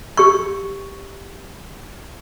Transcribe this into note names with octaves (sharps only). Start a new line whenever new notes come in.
G4 C#6